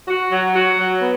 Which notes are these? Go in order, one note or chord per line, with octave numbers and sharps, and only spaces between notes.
F#4
F#3
F#4
F#3
B3